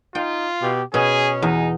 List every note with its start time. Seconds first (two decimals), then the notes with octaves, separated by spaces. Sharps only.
0.15 D#4 F4 G5
0.62 B2 G4
0.94 B2 C#4 G#4 G#5
1.42 E2 D#4 G#4 G#5